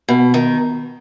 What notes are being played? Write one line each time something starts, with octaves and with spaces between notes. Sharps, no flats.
B2
D#3